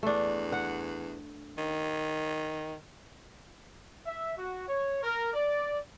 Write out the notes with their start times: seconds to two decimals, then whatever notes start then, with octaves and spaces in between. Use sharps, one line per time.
0.03 E2 A3 D4
0.52 F#5
1.58 D#3
4.06 E5
4.38 F#4
4.69 C#5
5.04 A#4
5.34 D5